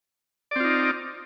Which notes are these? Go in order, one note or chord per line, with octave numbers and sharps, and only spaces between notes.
C4 D#4 F4 D5